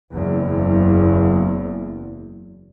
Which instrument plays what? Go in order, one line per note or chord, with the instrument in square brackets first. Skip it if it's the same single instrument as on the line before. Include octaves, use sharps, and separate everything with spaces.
[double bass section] F#1 E2